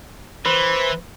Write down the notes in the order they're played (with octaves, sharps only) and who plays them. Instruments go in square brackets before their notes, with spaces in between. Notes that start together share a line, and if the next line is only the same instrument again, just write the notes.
[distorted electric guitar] E3 [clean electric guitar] B4 C5